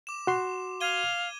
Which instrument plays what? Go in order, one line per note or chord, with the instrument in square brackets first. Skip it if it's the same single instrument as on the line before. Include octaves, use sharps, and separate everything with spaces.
[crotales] D6 E7
[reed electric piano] F#4 C6
[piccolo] F5 [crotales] G#6 D#7 G7